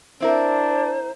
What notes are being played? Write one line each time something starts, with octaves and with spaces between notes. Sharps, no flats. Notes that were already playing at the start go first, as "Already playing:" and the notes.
C4 D4 E4 A#4 C5